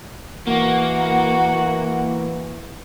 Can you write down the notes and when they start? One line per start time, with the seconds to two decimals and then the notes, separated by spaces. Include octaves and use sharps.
0.47 E3 A#3 F#4 F#5